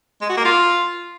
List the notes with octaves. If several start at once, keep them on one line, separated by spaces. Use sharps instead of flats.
G#3
F#4
A#3
F4